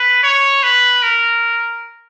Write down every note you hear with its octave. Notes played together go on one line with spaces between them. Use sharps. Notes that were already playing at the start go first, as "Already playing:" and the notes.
Already playing: B4
C#5
B4
A#4